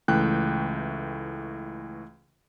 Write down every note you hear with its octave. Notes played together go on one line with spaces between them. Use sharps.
C#2 E3 A3 G5 F#6